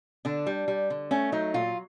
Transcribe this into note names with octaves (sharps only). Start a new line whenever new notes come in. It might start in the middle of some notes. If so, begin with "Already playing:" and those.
D3 D4
G3
G3
D3
A3 C#4
F#3 D#4
A#2 F4